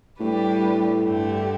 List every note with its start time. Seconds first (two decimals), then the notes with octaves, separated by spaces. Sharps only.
0.19 A2 G3 D4 G4 B4
1.04 G2 D3 A3 G4